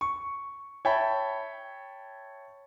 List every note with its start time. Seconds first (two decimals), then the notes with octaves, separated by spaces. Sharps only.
0.01 C#6
0.85 C#5 E5 G5 A5 B5